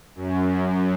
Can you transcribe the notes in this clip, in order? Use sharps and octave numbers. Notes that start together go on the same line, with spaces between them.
F#2